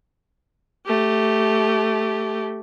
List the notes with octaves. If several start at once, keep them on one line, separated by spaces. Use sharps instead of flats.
A3 G4